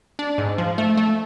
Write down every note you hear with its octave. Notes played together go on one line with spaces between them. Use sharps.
D4
G#2
F3
A3
A3